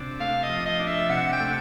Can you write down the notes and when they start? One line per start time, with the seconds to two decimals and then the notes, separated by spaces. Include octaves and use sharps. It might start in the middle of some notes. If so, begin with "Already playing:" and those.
Already playing: C3 D4
0.20 A3 F5
0.43 D#5
0.49 F3
0.65 D#5
0.80 D4
0.87 E5
1.09 C3 F#5
1.32 G5
1.40 A3